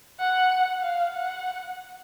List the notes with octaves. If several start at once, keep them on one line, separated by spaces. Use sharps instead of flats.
F#5
F5
F#5